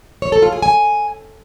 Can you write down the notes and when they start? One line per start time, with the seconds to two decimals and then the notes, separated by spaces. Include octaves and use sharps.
0.22 C#5
0.32 A4
0.42 F4
0.52 G#4
0.62 G#5